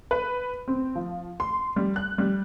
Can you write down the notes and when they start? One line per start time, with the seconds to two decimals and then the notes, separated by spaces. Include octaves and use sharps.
0.11 B4
0.68 C4
0.95 F3
1.40 C6
1.76 G3
1.96 F#6
2.18 G3